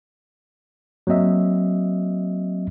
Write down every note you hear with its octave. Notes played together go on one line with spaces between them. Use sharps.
F#3 A#3 C4 D#5 E5